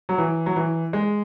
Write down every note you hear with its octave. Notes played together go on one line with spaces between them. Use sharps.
F#3
E3
F#3
E3
G#3